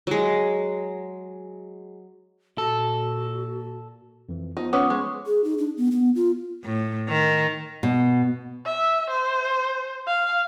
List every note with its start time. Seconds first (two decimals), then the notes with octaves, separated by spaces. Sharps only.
0.07 F#3 G#3
2.58 A#2 F#4 A4
4.29 F2 E3
4.57 F3 B3 D#4
4.73 C#4 B4 F#5 D6 D#6
4.90 G#3 C#6
5.27 G#4
5.44 D#4
5.58 D4
5.77 B3
5.91 B3
6.15 F4
6.64 A2
7.08 D#3
7.83 B2
8.65 E5
9.10 C5
10.07 F5